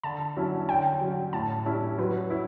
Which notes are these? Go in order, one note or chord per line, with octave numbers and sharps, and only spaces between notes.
D3 A5
F#3 C#4 E4
D3 G5
F#3 C#4
A2 A5
G3 C#4 E4
F#3 B4
E4